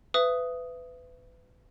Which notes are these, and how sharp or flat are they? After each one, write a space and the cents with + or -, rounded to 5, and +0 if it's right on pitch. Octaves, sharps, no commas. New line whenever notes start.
B4 +25 E5 +30 D#6 +0